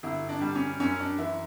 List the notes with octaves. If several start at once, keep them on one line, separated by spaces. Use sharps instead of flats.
G1 E4
D4
G3
C#4
F#2 C#4
D4
E3 E4